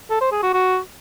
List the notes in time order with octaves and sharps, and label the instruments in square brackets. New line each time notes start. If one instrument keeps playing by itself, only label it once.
[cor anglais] A4
C5
G#4
F#4
F#4